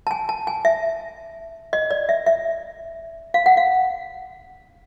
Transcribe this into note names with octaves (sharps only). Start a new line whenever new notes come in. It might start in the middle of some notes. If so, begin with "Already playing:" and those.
A5
G#5
A5
G#5
E5
D#5
D5
E5
E5
F5
F#5
F5